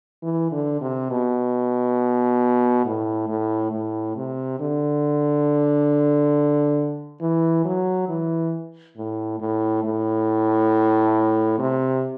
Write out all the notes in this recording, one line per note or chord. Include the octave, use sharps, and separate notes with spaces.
E3
D3
C3
B2
A2
A2
A2
C3
D3
E3
F#3
E3
A2
A2
A2
C3